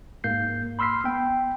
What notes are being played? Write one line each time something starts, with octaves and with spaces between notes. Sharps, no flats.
G#2 A#3 G6 C7
B5 C6 E6 F6 B6 C7
B3 G5